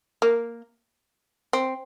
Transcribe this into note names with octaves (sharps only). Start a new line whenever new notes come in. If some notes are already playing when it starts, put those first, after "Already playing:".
A#3
C4